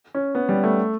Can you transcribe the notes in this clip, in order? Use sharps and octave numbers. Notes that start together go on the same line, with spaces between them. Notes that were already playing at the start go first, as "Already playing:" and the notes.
C#4
B3
G3
A3